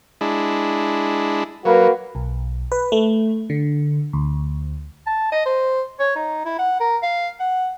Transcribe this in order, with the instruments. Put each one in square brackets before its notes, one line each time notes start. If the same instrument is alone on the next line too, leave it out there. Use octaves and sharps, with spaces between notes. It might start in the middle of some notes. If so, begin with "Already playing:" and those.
[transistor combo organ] G#3 D4 E4
[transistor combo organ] F#3 [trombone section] A#3 F#4 B4
[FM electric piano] B1
B4
A3
D3
D2
[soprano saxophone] A5
D#5
C5
C#5
D#4
E4
F#5
A#4
F5
F#5